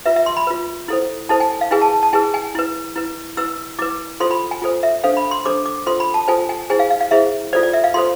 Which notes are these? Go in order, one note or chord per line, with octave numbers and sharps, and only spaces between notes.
F4 B4 E5
E5
C6
B5
F4 B4
E4 A4 C5
E4 A4 C5 A5
G#5
F5
E4 G#4 B4 G#5
A5
A5
E4 G#4 B4 G#5
G#5
E4 B4
E4 B4
E4 B4 E6
E4 B4 D6
F4 A4 C5 C6
B5
G#5
F4 A4 C5
E5
D4 A4 C5 F5
B5
C6
D4 A4 C5 D6
D6
F4 A4 C5 C6
B5
A5
F4 A4 C5 G#5
G#5
E4 G#4 C5 G#5
F5
F5
F5
E4 G#4 C5 E5
F4 A4 C5 D5
D5
E5
F5
F4 A4 C5 C6